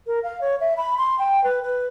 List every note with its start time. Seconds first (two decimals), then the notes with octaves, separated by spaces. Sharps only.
0.07 A#4
0.23 F5
0.41 C#5
0.61 E5
0.77 B5
0.98 C6
1.19 G5
1.44 B4
1.63 B4